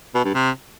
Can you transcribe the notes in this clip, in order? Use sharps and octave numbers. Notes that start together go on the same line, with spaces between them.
B2
G2
C3